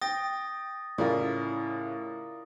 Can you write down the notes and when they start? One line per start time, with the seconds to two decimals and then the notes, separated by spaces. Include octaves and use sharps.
0.01 G5 D#6 A6 A#6
0.98 A2 C#3 E4 F4 A#4 D5